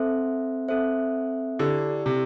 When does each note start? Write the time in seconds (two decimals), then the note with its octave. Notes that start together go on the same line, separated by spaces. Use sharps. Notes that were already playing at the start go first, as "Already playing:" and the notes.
Already playing: C4 A4 C5 E5
0.68 C4 A4 C5 E5
1.59 D3 E4 G4 D5
2.06 C3